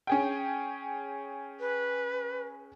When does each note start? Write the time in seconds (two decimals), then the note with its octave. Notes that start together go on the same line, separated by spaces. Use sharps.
0.07 C#4 G#4 G5
1.60 B4